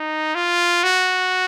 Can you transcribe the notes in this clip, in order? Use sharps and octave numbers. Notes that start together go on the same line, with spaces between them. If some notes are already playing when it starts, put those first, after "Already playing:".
Already playing: D#4
F4
F#4